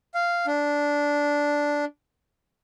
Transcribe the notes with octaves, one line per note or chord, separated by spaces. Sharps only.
F5
D4